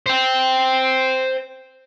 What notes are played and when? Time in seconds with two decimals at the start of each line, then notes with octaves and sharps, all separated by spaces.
0.06 C5 G5